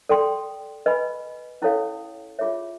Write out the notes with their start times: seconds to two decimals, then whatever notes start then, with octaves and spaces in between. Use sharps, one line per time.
0.09 A4 D5 G5 C6
0.86 B4 D#5 G#5 B5
1.62 C#4 E4 A4 C#5 F5
2.39 F4 G#4 C#5 E5